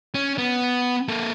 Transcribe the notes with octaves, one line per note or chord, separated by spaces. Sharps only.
C#4
B3
A#3 A4